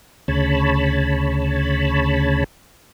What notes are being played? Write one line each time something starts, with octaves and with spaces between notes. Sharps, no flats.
D2 C#3 C#5 A5 B5